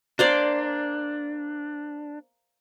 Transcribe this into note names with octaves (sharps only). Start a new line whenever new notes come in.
A#3 D4 C5 D5